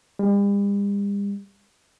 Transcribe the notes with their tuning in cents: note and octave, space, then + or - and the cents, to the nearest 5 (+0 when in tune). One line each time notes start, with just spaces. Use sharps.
G3 +45